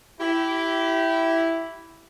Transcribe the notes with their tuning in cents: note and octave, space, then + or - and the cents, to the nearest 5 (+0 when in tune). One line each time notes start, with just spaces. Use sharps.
E4 +0 G4 -20